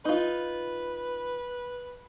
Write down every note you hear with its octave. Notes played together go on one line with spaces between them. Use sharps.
D#4 F4 B4